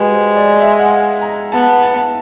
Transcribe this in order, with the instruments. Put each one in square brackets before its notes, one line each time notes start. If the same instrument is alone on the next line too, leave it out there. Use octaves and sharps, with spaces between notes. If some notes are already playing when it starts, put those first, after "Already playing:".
Already playing: [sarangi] G#3 [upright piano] F#4 G4 B4
[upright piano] C5
D5
E5
F#5
F5
A#5
[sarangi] B3 [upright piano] A5
[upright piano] A5